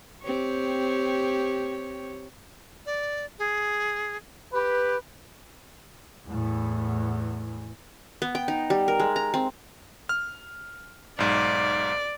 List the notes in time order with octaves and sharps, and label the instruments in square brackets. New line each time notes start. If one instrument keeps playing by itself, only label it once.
[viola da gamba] C4 G4 C#5
[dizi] D5
G#4
[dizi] G4 [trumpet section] B4
[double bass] E2 A2
[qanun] B3
G5
D#4
G3
A#4
G#3
A#5
C4
[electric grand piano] F6
[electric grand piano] B1 G#2 [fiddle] D5